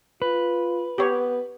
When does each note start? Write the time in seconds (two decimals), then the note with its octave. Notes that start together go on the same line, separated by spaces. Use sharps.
0.22 F4 B4
0.98 B3 G4 C#5